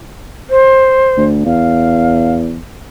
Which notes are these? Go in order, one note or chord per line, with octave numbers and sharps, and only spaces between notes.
C5
D2
E2 F5